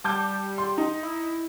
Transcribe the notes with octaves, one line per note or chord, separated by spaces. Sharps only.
G3 A5 D6 G6
C6
D#4
E4